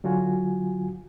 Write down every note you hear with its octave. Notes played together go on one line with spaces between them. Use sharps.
D3 F#3 F4 F#4 G#5